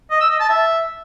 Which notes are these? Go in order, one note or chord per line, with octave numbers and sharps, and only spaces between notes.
D#5
E6
D#5
A5
E5